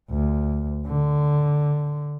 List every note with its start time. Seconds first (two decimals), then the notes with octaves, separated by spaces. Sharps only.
0.10 D2
0.87 D3